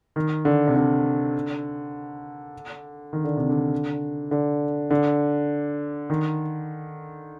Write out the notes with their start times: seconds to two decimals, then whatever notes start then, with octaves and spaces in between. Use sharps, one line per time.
0.16 D#3
0.45 D3
0.67 C3
0.76 D3
3.13 D#3
3.24 D3
3.36 C3
3.49 D3
4.31 D3
4.90 D3
6.10 D#3